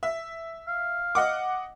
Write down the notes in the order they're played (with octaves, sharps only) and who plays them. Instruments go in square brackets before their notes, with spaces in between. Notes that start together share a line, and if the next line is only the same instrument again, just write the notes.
[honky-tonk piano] E5
[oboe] F5
[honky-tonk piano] D#5 F#5 D6